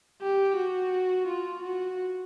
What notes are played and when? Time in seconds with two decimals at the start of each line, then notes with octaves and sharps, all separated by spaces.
0.22 G4
0.57 F#4
1.27 F4
1.62 F#4